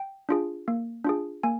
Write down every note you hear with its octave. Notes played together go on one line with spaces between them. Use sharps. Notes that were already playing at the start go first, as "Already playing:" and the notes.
Already playing: G5
D4 F4 G#4
A#3
D4 F4 G#4
A#3 G#5